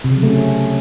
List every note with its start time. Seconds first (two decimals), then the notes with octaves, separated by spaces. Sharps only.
0.04 C3
0.11 C#3
0.17 F#3
0.23 A3
0.29 C#4